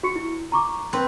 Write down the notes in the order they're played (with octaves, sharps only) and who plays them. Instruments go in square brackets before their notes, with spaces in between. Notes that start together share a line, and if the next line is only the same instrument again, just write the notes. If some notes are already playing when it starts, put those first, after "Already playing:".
[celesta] F#4 C#6 C#7
E4
A#5 C#6 D6
[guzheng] C4 B4